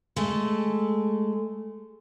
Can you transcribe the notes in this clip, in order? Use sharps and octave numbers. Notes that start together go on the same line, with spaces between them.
G#3 A3 A4